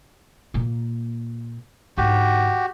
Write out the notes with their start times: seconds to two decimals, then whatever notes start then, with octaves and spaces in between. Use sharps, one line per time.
0.54 A#2 A#3
1.97 G#2 D3 F#4 G4